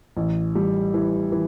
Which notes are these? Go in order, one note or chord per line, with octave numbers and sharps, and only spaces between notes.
A1
G3
E3
E3